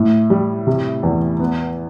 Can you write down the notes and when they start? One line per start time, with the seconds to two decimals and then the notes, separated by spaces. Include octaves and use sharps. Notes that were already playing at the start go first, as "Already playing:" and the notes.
Already playing: A2
0.30 G3
0.67 C3
1.03 E2
1.40 B3